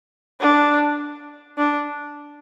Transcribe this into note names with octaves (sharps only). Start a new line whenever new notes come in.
D4
D4